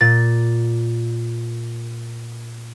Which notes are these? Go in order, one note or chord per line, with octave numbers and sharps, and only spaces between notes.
A#2 A6